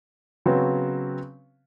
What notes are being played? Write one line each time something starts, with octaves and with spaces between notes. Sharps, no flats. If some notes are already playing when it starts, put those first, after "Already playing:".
C#3 F#3 B3 C4